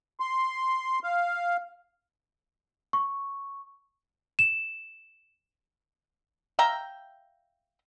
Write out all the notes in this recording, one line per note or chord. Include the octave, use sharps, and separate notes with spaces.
C6
F5
C#6
E7
E5 F5 G5 A#5